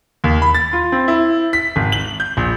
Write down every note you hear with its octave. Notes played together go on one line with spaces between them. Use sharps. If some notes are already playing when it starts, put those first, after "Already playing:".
D#2
B5
A6
F4
C4
E4
B6
G#1
F#7
G6
A#1